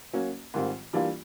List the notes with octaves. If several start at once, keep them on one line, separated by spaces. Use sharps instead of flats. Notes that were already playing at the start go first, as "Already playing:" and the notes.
F#3 A#3 C#4 F#4
G#2 D#3 G3 C4 F4
E3 G3 A#3 D4 F4